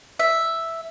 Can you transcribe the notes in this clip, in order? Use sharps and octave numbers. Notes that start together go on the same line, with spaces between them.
E5